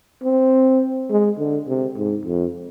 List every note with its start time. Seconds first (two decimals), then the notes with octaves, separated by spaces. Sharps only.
0.23 C4
1.10 G#3
1.39 D3
1.68 C3
1.97 G#2
2.26 F2